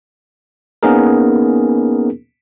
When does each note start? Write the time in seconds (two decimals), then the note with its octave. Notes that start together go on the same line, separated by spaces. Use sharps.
0.83 A#3 B3 C#4 D#4 G#4 A#4